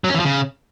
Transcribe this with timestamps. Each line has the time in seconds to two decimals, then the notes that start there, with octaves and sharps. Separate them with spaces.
0.04 F#3
0.09 C#4
0.15 E3
0.20 F3
0.25 C#3